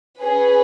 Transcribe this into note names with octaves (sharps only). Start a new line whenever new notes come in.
C#4 G#4 B4